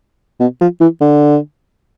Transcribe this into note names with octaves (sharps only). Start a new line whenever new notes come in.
B2
F3
E3
D3